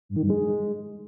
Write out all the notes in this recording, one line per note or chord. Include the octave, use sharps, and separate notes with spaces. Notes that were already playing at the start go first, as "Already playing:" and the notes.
G2
D#3
G2
G#3